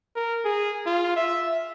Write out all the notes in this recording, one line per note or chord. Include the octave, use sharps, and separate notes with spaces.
A#4
G#4
F4
E5